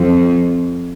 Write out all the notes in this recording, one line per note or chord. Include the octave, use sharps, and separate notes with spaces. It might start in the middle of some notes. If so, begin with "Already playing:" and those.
Already playing: F2